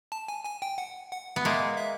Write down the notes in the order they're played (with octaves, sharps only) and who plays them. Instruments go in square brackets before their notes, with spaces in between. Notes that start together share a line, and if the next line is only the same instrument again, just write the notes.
[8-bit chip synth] A5
G#5
G#5
G5
F#5
F#5
[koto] B3
[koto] G#3 A#3 [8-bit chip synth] E5
[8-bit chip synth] E5